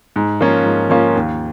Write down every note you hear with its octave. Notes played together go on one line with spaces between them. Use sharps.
G#2
F3 A#3 C#4 F4
G#2
F3 A#3 C#4 F4
D#2